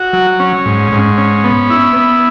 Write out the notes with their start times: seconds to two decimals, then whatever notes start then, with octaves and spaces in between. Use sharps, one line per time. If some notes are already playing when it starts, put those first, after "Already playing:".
Already playing: F#4
0.13 F#3
0.40 C#4
0.66 G#2
0.92 G#2
1.18 C#4
1.44 B3
1.70 E4
1.96 B3